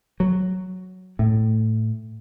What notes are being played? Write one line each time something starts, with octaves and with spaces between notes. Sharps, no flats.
F#3
A2